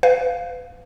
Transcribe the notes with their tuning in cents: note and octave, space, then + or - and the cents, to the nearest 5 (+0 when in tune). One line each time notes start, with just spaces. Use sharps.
B4 +35 F5 +5